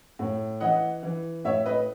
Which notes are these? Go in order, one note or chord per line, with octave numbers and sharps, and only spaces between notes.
A2
E3 D#5 F#5
E3
A2 C#5 E5
B4 D#5